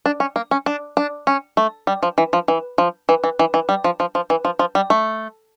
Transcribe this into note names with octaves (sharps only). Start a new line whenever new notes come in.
D4
C#4
A#3
C#4
D4
D4
C#4
A3
G3
F3
E3
F3
E3
F3
E3
E3
E3
E3
G3
F3
F3
F3
E3
F3
F3
G3
A3